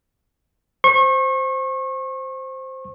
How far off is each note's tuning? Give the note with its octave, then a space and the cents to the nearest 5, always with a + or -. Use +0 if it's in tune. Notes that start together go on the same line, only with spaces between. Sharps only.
C5 +0 C#6 -35